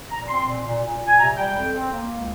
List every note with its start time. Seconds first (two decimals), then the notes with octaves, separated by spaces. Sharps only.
0.10 A#2 A#5
0.28 C4 C6
0.46 A#2
0.65 A#2
0.83 A#2
1.01 A#2
1.07 G#5
1.19 C3 A#5
1.37 G3 G5
1.55 F2
1.73 C4
1.92 A#3
2.09 C#2